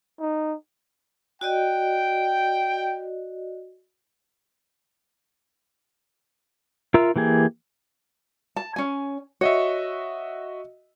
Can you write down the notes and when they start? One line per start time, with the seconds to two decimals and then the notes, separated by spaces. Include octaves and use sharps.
0.20 D#4
1.41 F#4 D5 D#5 G5
6.94 F4 A#4 E5 A#5 E6
7.16 E3 A#3 G4 G#4
8.56 A5
8.76 C#4 G#5
9.41 F#4 C#5 D#5 E5